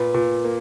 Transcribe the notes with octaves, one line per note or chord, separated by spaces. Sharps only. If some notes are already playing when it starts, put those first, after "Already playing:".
Already playing: A#2 B4
A#2
A#3